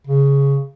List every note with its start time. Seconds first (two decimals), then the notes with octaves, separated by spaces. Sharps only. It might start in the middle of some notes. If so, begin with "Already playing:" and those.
0.07 C#3